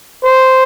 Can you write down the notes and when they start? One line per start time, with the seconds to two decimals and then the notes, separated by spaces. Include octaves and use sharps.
0.24 C5